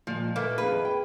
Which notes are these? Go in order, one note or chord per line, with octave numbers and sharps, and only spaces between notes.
A#2 F3 G#3
A3 A#3 B4
F2 D#3 G#4 B4
G5